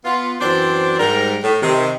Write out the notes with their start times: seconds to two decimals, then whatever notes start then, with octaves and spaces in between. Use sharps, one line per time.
0.04 B3 F4
0.41 F#2 E3 C4 D4 C5 D5
0.99 G#2 G3 A#4
1.43 A2
1.62 C3 D#3